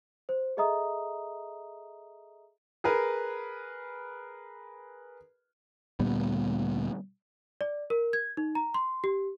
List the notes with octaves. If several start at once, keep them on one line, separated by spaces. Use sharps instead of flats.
C5
G#4 A4 D#5 E5 A#5 D#6
G#4 A#4 B4
D2 A#2 G3 B3
D5
A#4
G#6
D#4
A#5
C6
G4